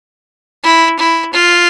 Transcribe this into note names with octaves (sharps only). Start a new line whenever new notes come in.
E4
E4
F4